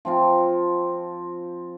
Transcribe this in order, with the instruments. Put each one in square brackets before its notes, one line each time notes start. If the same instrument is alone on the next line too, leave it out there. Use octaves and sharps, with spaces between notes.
[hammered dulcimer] F3 C4 F4